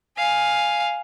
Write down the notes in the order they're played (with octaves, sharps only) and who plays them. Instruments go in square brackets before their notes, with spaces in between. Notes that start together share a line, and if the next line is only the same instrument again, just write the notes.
[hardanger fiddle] F5 G#5